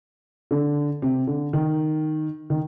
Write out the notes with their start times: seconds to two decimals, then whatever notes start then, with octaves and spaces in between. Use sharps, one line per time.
0.51 D3
1.02 C3
1.27 D3
1.53 D#3
2.50 D#3